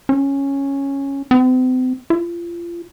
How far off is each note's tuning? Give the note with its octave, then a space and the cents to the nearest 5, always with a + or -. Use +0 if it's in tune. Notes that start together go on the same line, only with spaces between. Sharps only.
C#4 -5
C4 -40
F4 -30